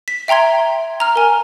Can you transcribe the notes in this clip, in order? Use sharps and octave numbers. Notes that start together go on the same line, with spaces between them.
B6
E5 G5 A#5 C6 G#6
A#5 F6
A#4 G#5